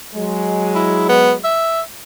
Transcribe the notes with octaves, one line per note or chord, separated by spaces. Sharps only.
F#3 G#3
E4
B3
E5